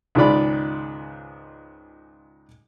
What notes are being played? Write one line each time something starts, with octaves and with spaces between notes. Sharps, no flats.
C#2 G#2 D#3 F4 D5 B5